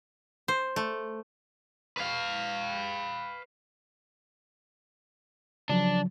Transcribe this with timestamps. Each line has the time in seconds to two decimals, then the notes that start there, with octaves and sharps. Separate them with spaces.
0.48 C5
0.76 A3
1.97 B4 F5
5.70 C#3 F3 F#3 D4